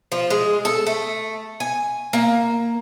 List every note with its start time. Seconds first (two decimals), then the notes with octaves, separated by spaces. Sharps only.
0.12 F3
0.30 G#3
0.65 A4
0.87 A3
1.60 G#5
2.13 A#3